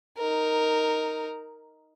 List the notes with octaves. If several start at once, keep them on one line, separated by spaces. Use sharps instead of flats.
D#4 A#4